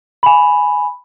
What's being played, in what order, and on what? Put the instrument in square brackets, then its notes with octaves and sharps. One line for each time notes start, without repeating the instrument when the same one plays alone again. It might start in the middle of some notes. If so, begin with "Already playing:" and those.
[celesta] G#5 B5